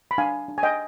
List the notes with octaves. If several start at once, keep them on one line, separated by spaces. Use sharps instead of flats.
B5
D4 F5 G#5
D4
G#5
D#5 G5